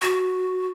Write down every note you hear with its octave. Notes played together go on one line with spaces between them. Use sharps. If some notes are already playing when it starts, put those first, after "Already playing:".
F#4